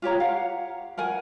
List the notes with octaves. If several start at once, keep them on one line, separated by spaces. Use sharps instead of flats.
F4 G4 C#5 A#5
F5 F#5
A#4 F#5 G#5